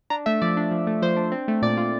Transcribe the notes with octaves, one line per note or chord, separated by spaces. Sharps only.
D4 A#5
A3 E5
F3 D5
D4
F3
A3
F3 C5
D4
C4
A3
A#2 D5
F4